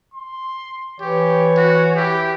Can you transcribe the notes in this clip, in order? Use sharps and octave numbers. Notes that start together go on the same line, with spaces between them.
C6
E3 G4 C#5
F#4
E4 G4